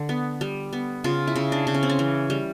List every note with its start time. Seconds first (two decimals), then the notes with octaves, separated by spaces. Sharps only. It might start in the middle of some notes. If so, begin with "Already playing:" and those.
Already playing: D3
0.09 B3
0.41 G3
0.73 B3
1.04 C#3 F4
1.27 E4
1.36 C#3
1.52 D4
1.67 C#3
1.74 C#4
1.83 C4
1.90 C#4
1.99 E3
2.30 G3